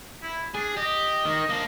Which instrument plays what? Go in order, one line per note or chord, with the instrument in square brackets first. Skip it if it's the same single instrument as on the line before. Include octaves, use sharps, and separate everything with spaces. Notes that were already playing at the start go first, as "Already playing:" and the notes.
[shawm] E4
[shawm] D4 [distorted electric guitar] G#4
[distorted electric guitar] G4 [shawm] D#5
[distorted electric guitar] D#3
A#3 D4